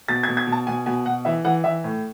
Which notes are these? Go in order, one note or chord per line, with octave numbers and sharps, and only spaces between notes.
B2 A6
G#6
B2
G#6
B2
A5
B2 G#5
B2 G#5
B2 F#5
E3 E5
E3 F#5
E3 E5
A2